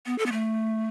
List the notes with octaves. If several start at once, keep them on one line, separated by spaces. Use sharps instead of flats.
B3
A4
B3
A3